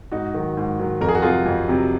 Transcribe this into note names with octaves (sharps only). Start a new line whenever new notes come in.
G#2 D#4 F#4
D#3 F#3
G#2
D#3 F#3
F2 A#4
G#4
F#4
C3 F#3 F4 G#4
F2
C3 F#3